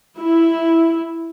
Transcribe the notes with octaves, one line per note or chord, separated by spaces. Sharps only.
E4